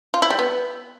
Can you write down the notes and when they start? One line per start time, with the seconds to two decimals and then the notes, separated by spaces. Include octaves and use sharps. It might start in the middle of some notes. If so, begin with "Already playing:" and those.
0.14 F4
0.22 E4
0.30 G3
0.39 B3